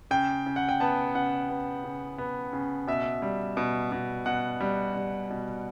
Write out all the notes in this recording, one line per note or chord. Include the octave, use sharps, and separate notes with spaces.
C#3 G5
C#3
F#5
G5
B3 A5
C#3 F#5
B3
C#3
B3
C#3
B2 E5
G3
B2
B2
B2 F#5
G3
G3
B2